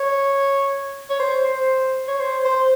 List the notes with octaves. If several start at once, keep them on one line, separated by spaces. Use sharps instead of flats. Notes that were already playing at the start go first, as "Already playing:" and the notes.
Already playing: C#5
C#5
C5
C5
C#5
C5
C5